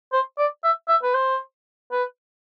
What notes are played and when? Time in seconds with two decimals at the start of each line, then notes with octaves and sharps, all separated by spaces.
0.12 C5
0.38 D5
0.64 E5
0.88 E5
1.03 B4
1.14 C5
1.92 B4